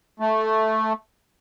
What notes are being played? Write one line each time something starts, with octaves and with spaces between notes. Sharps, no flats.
A3